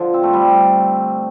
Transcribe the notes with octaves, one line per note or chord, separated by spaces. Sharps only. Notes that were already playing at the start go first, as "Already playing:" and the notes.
Already playing: D3 F3
C4
A3
G3